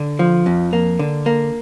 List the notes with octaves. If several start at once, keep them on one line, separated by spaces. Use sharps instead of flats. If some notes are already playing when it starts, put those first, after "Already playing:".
Already playing: D3
F3
F2
A#3
D3
A#3